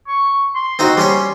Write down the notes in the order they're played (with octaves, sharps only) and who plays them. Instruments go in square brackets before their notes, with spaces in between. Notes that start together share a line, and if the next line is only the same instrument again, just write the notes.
[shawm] C#6
C6
[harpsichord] C4 D#4 F#4
G3 C#4 C#5